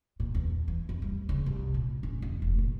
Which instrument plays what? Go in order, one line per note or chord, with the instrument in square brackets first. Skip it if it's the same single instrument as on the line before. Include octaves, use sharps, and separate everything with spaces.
[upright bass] A#2
E2
E3
F2
G3
C#3
C2
A#2
C#4
E2
F1
A#2